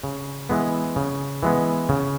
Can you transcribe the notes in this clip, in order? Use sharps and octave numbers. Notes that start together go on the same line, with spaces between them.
C#3
E3 G#3 B3
C#3
E3 G#3 B3
C#3